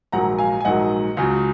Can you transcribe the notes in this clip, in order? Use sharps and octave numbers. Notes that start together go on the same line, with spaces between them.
A#1 G#2 D#3 F#3 F#5 A#5
F5 G#5
G#5
A#1 G#2 D#3 F#3 D#5 F#5
C#2 C#3 F#3